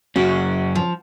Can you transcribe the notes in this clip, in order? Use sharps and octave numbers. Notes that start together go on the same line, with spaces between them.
F#2 C#3 C#4 F#4
F3